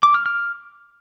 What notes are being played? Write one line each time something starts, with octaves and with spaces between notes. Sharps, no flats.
D6
F6
F6